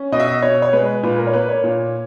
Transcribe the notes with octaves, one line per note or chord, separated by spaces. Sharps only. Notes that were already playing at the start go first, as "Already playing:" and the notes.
Already playing: C#4
B2 D#5
E5
D#5
B2 C#5
C#5
G#3 B4
A#2 B4
A#4
C#5
A#3 B4
C#5
A#2